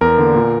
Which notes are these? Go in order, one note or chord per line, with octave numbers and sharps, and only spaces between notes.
E2 A#4
D3 A#3
A#2